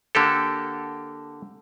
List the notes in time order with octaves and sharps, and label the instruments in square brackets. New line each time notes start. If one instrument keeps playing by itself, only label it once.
[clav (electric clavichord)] D3 A#3 G4 A4